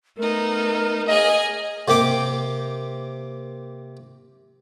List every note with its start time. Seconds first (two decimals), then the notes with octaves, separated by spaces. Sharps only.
0.18 A3 B3 D#4 A#4
1.08 G#4 D#5 G#5
1.88 C3 A#3 G4 D6